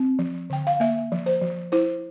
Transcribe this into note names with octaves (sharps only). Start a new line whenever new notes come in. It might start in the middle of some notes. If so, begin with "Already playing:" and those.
Already playing: C4
F3
D3 G5
F5
A#3 E5
F3
C5
F3
E4 C5